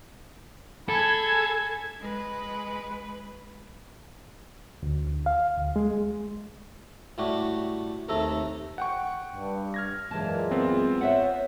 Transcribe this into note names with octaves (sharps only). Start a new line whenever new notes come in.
G#4 A4 B5 G#6
G#3 B4
D2
F5
D2
G#3
A2 G3 A3 F#4 G4
D#2 C3 A3 A4 E5 A#5
F#5 G5 C#6
G2
F6 G#6 A#6
F#2 A#2 E3 G#3 A5
B3 C4 F4
C5 C#5 E5 F#5